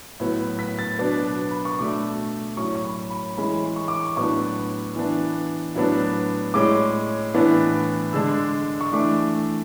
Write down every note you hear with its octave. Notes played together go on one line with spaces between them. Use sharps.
A2 F#3 B3
B6
A6
B2 F#3 B3 D4
B5
C#6
B2 A3 D4 D6
A2 F#3 C#4 C#6
C#6
B5
B5
E3 G#3 C#4 B5
C#6
D6
C#6
A2 F#3 B3 D4 C#6
E3 B3 D4
A2 F#3 B3 D4
A2 G#3 C#4 D6
A2 E3 B3 D4
D3 G#3 D4 E6
C#6
E3 A3 D4 D6